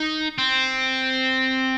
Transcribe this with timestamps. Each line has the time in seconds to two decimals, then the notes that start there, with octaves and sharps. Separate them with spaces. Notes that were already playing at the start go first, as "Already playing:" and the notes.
Already playing: D#4
0.38 C4